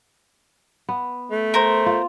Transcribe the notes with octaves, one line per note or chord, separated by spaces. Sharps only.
B3
A3
A#4 C5
F4